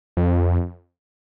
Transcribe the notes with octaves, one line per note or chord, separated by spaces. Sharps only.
F2